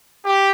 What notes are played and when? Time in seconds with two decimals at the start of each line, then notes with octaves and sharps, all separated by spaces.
0.24 G4